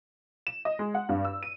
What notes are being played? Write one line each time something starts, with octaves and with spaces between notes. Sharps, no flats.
E7
D#5
G#3
F#5
G2
E6
D#7